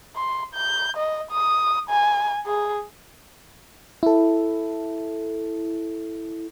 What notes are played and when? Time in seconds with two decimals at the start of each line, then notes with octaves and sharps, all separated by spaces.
0.16 C6
0.54 G6
0.97 D#5
1.31 D#6
1.90 G#5
2.47 G#4
4.03 E4 A4